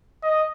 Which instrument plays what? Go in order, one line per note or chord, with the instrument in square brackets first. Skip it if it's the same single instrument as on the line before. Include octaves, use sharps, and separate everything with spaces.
[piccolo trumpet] D#5